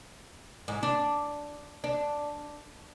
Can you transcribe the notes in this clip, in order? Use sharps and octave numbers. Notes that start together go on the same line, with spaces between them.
G#2
D4
D4